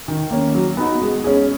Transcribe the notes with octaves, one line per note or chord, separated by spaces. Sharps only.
D#3
A#3 C#4
F#3
B3 D#4 F#4
G#3
C#4 G#4